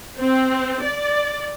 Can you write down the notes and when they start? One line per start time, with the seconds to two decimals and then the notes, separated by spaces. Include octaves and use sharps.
0.20 C4
0.83 D5